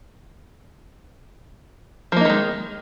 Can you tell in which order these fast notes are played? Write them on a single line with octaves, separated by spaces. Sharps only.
F3 A#3 D#4 D#3 G#3